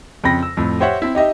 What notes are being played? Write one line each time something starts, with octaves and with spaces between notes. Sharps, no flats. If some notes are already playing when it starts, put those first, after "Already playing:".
F2 C#3 C4 G5 B5 A#6
E6
F2 A2
G4 C5 C#5 E5 F#5
C4 E4
D#4 G4 D#5 E5